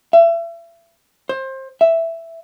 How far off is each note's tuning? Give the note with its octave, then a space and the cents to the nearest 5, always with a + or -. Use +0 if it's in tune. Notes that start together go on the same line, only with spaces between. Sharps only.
E5 +35
C5 +25
E5 +5